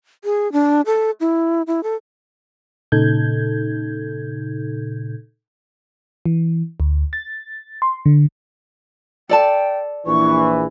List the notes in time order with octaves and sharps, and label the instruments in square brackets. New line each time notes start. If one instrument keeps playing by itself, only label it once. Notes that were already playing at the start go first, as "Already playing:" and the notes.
[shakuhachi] G#4
D4
A4
E4
E4
A4
[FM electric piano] A#2 C#3 D#4 A4 G6 G#6
E3
D2
A6
C6
D3
[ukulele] A4 D5 A5 [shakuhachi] G5
[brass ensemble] A#1 E3 [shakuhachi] C#6